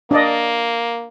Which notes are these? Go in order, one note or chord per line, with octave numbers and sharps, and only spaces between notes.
A#3 D4 D5 D#5